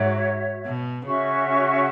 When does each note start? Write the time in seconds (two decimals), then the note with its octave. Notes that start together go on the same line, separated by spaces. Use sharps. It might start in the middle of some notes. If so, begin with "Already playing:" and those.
Already playing: G#2 F#4 C#5 E5
0.65 B2
1.04 C#3 C#4 F#4 E5 C#6